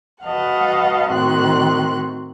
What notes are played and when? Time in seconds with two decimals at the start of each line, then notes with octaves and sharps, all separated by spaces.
0.23 F#4 B4 D#5 F5 F#5 A5
1.11 A2 D#3 C4 F#4 C6 F#6